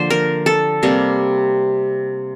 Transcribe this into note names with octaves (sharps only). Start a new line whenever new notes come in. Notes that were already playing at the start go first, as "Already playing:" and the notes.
Already playing: D3 F3 A#3 C5
A#4
A4
C3 G3 A#3